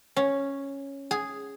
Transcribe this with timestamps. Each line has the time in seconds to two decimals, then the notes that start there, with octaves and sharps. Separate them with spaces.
0.17 C#4
1.11 G#4